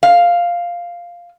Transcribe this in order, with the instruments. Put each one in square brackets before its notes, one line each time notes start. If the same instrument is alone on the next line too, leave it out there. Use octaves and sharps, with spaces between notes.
[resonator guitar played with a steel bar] F5